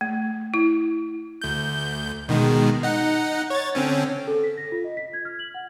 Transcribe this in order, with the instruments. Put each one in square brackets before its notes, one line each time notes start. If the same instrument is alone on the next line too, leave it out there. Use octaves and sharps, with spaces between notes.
[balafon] A3
E4
[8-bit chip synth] D2 G6
B2 D#3 G#3
D#4 F#5
C#5 A6
D3 C4 C#4
[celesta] A4
B6
A#6
F4
D#5
B6
G#6
F6
F#7
F#5